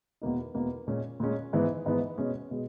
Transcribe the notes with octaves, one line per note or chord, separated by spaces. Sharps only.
E2 B2 A#3 D#4
E2 B2 A#3 D#4
A#2 G#3 C#4
A#2 G#3 C#4
G#2 E3 B3
G#2 E3 B3
B2 G#3 C#4
B2 G#3